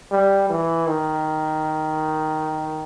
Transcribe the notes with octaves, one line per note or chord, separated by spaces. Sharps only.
G3
E3
D#3